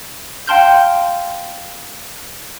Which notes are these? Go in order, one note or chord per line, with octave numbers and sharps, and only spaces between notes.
F5 G5 A5 C6 F6 G6